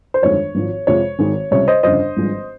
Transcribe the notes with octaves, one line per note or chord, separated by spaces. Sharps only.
C5
G1 F2 D#3 G#3 C#5
G#1 G#2 F3
F2 C3 F3 G#3 C#5
G#1 G#2 D#3 G#3
C#2 C3 G3 C#5
C5 D#5
G1 F2 C#3 C5 D#5
G#1 G2 F3 G#3